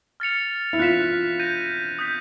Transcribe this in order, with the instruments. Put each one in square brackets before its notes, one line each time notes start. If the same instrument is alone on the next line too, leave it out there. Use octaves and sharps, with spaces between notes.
[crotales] F6 A6 C#7 F7
[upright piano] E4
[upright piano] F4 [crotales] F#6 B6 E7
[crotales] G6 A#6 D#7
D#6 G6 B6